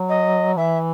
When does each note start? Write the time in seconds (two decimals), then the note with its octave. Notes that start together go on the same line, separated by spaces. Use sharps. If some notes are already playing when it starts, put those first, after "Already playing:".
Already playing: F#3
0.09 D#5
0.57 E3 E5